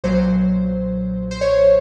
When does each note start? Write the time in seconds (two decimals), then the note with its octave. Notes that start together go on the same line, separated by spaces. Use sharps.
0.04 B1 A#2 F#3 C5
1.31 C5
1.41 C#5